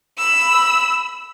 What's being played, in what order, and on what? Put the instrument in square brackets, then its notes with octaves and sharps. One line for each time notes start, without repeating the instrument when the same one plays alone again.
[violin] B5 E6